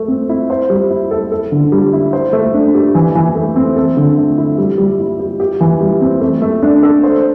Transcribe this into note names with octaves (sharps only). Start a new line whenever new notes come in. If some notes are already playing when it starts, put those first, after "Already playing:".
Already playing: A3
C4
E4
C5
G3
E4
A4
A4
D3
G3
E4
C5
A3
D4
G4
E3
E3
A3
C4
A4
D3
A3
E4
G3
G3
E4
G4
G4
E3
G3
C4
A3
A3
D4
A4
C5